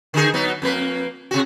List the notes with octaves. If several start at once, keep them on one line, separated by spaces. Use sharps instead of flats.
D3 D#4 G#4
F#3 B3 D#4
F2 A#3 B4
C3 F#4